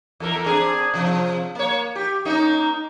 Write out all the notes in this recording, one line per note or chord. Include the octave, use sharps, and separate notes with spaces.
E2 A4 A#4
C4 D4 G#4
C3 F3
A#3 C#5
G4
A#3 C#4 D#4